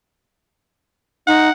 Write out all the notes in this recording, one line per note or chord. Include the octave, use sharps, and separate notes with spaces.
D#4 F#5